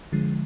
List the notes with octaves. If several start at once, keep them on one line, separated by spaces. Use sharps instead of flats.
D3 F3 G#3